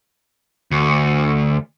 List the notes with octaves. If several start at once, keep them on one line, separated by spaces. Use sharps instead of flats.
D2